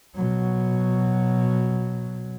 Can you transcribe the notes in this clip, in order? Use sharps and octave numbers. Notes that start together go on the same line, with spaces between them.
B2 F#3